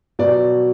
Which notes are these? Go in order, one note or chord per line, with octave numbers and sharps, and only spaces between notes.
B2 F#3 B3 D5